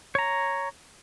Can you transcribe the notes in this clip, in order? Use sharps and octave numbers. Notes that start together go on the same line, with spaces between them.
C#5 A#5